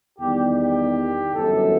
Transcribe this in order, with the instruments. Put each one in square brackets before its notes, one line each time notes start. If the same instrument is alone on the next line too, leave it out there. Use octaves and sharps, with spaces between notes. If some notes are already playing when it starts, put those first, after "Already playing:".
[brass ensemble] E2 D#3 G3 G4
G4
G1 F#2 E3 A4